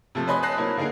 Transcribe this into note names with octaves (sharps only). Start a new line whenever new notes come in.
C3 F3 A3
B4 C5 D#5 G#5 B5 C6
A5 B5 D#6 F#6 A#6 C7
F#3 A#3 E4 C5
D3 A#3 D#4 G#4 A#4